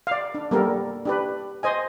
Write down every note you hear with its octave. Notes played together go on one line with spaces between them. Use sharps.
D5 F5
D4
G3 A#3 B3 D4 A4 A#4
D4 G4 B4
C5 D#5 G#5